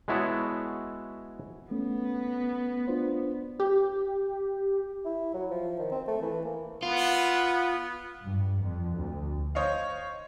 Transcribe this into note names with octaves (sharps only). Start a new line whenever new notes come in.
G#3 B3 E4 F#4 C#5 A5
A3 B3 C#4
D4 F4 C5
G4
E4
F#3
F3
D#3
C4
A3
E3
A#3
B3 F4
G2
F2
D2
C5 C#5 D#5 F5